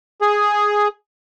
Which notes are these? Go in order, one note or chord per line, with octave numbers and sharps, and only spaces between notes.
G#4